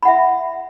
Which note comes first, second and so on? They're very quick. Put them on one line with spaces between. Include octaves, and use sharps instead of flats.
B5 F#5 E5